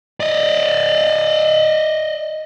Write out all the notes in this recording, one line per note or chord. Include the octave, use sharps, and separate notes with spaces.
D5 D#5